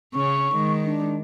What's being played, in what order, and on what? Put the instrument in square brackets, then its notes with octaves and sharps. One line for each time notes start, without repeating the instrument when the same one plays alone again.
[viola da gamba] C#3 C#4 [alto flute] C#6
[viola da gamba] D#3 G#3
[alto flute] D4